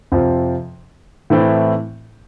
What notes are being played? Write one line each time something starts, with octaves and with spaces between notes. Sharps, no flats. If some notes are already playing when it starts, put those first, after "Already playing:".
F2 C3 F3 C4 F4
A2 E3 A3 C4 E4